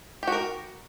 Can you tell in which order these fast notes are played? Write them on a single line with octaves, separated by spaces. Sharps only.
G4 F#4 A#4